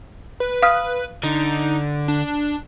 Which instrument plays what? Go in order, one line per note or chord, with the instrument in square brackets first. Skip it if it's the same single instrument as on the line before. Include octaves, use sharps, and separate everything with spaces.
[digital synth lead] B4
[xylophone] F5 D#6 F6
[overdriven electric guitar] D3 [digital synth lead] D#4
[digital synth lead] D4